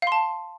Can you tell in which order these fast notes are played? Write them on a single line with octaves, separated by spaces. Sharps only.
F5 C6 A5